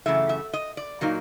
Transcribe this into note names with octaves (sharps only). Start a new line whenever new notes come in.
F#2 C#3 E3 A3 E5
E5
D#5
D5
A#2 F#3 A#3 D#4